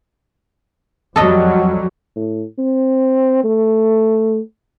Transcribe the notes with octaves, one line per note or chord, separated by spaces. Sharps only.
F2 F#3 G3 A4 D#5
A2
C4
A3